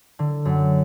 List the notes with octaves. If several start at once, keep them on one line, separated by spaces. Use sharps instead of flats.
D3
F#2